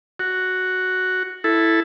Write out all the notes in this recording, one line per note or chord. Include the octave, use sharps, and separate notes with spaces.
F#4
E4 A4